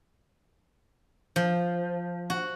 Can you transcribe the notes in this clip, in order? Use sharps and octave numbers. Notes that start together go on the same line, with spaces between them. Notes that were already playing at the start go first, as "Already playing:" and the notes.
F3
F#4